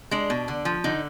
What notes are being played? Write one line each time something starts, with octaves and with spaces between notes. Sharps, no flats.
G#3 D4
B2
D3
F3
D3 D#4